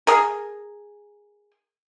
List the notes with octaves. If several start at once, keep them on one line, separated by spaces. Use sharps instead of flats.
G#4 A#4